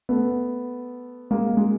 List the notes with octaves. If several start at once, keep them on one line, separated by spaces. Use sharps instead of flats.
A3 B3
G#3 A#3
G#3